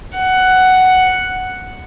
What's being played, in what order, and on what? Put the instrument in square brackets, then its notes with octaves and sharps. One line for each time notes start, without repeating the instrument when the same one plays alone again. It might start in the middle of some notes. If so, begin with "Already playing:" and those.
[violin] F#5